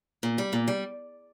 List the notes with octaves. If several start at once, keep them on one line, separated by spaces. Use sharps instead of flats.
A#2
G3
A#2
G3